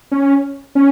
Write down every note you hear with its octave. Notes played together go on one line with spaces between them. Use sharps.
C#4
C#4